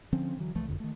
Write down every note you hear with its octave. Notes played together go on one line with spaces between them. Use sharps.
D3 F3 C4 C#4
D3 E3 F#3
C2 E3 F3 A3
F#1 F2 D3
D#3 A3